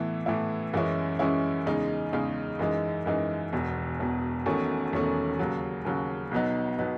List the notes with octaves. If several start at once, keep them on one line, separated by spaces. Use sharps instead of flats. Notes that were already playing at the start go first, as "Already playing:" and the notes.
Already playing: A2 E3 B3 E4
A2 E3 B3 E4
F#2 E3 G#3 C#4 E4
F#2 E3 G#3 C#4 E4
E2 C#3 G#3 D#4
E2 C#3 G#3 D#4
F#2 E3 G#3 D#4
F#2 E3 G#3 D#4
E1 E2 B2
E1 E2 B2
E1 E2 D#3 A3 C#4
E1 E2 D#3 A3 C#4
D#2 C#3 F#3
D#2 C#3 F#3
B1 B2 F#3 B3 D#4
B2 F#3 B3 D#4